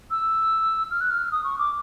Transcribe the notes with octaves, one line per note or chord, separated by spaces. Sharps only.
E6
F6
F#6
F6
D#6
C#6
D6